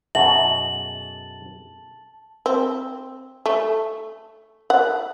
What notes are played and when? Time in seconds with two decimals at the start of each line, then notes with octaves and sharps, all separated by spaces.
0.15 F#2 B2 G#4 E5 A5 F#7
2.46 C4
3.46 A3
4.70 F#5